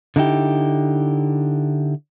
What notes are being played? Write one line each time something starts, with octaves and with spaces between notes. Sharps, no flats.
D3 D#4 E4 G4